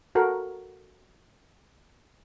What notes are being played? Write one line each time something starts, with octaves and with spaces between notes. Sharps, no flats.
F#4 A4 A#4 F#5